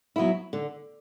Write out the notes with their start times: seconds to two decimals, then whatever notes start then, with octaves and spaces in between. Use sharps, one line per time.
0.16 F#3 B3 E4
0.53 D3